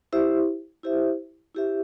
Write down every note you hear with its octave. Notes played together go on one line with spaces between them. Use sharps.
E4 G4 C5 E5
E4 G4 C5 E5
E4 G4 C5 E5